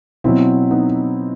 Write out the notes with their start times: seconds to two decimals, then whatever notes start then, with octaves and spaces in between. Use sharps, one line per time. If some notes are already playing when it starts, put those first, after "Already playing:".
0.24 B2 F#3 C4 E4
0.71 B3 D#4